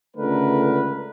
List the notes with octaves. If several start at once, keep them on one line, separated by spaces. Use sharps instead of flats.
C#2 D3 A3 A#4 B4